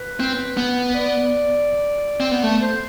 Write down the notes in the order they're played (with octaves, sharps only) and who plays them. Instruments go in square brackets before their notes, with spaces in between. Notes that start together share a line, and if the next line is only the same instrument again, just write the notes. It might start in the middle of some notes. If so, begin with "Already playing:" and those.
Already playing: [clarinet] B4
[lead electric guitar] C4
B3
[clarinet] D5
[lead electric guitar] C4
B3
A3
[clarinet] C5